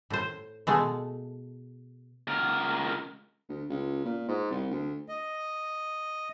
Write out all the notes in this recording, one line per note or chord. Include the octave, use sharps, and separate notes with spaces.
A2 C5
B2 G#3 A3
C#2 A#4
D2
C#2
A#2
G#2
C2
D2
D#5